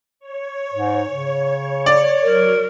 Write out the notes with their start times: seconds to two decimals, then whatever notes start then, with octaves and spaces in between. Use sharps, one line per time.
0.20 C#5
0.74 G#2
1.10 C#3
1.86 D5
2.23 F#3 A#4